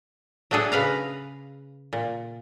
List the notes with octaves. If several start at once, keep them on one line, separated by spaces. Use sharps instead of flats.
F#3 A3 D4 G#4 A4
C#3 B4 F5 A#5
A#2